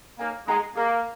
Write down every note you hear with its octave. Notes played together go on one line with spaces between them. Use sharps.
A#3 D#4 A#4 C#5 G#5
G#3 D#4 G#4 F#5 A#5
A#3 G#4 D#5 A#5